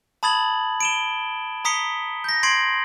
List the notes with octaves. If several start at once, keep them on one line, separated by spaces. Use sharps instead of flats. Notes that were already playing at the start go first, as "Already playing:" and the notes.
A5 B5 D#6 G#6 A6 F#7
D7 E7 G7
A#5 D#6 B6 C#7 G7
G6 A#6
C6 G#6 C7 D7 F#7